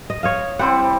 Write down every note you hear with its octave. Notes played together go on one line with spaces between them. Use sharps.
D#5
C#5 D#5 F5
G3 C4 E4 C5 F#5